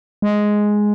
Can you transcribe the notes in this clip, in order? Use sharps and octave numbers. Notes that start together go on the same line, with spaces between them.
G#3